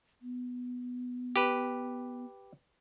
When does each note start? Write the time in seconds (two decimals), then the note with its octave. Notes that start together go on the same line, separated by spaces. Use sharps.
0.22 B3
1.36 G4 B4